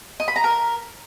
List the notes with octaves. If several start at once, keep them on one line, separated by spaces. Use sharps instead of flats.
D#5
B5
A#5
A#4